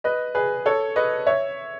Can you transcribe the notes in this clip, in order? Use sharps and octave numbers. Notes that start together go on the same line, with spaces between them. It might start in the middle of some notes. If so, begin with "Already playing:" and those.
B4 D#5
G#4 B4
A4 C#5
B4 D#5
C#5 E5